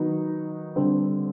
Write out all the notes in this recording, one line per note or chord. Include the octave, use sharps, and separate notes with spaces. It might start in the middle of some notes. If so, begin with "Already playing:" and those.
Already playing: D#3 F#3 B3 D#4 F#4
D3 G3 C4